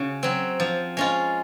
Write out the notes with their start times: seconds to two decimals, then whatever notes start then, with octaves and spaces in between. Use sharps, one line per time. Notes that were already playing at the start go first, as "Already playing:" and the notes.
Already playing: C#3 C#4 F#4
0.23 F#3 C4
0.60 F3
0.97 G#3 C#4 F4